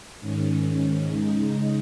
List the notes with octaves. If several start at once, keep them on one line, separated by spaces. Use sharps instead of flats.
G#2 D#3 C#4
C#3 G#3 D#4